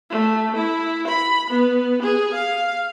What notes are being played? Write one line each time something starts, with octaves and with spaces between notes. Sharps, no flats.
A3
E4
B5
B3
G#4
F5